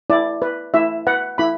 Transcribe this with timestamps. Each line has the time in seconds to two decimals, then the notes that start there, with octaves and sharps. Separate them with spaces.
0.10 E4 D5
0.42 B4
0.74 E4 E5
1.07 B4 F#5
1.38 E4 B5